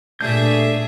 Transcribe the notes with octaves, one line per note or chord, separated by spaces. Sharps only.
G2 A#2 A3 D4 G#4 E5 G6